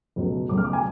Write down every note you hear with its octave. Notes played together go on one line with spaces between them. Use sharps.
C#2 B2 F#3 A3
C#2 B2 F#3 A3 D6
F6
D6
G#5